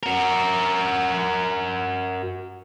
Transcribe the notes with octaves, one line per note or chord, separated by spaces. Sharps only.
F#4 A#4